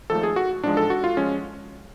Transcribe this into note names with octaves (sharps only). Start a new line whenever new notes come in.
G#1 G#2 F3 A3 A4
G#4
F#4
A1 G#2 F3 G#3 D4
A4
F#4
F4
F3 G#3 C#4